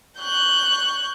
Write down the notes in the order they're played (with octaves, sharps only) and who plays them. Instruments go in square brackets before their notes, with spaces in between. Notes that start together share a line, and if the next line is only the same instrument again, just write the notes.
[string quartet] C#6 F#6 G6